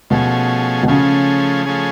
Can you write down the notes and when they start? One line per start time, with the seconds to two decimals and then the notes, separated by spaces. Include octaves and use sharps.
0.10 B2 F3 A3 C#4 G#4
0.83 B2
0.88 C#3 F3 A3 C#4 G#4
1.66 F3 A3 C#4 G#4